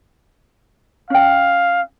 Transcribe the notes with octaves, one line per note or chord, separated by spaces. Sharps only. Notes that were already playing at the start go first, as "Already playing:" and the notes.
C#4 F5 G5